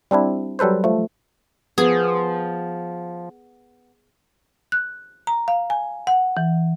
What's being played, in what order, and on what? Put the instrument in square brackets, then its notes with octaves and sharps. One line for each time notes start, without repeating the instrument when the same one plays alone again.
[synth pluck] G3 C4 D4 E4
F#3 G3 A4 B4 C5
F3 A3
[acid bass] F3 [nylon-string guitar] B3 [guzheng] G#4
[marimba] F#6
A#5
F5
G#5
F#5
E3